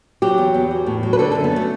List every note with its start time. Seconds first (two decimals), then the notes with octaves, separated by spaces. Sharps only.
0.22 F#3 G4
0.38 E2
0.54 E2
0.71 F#3
0.86 A2
1.03 F#3
1.13 B4
1.19 D3 A4
1.32 F#2 A4
1.44 B3
1.52 F#3 A3